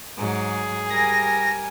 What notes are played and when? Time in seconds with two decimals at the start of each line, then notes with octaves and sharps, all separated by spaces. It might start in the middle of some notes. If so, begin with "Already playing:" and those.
0.18 G#2 F#3 G#4
0.90 G3 A#4 G#5 A#6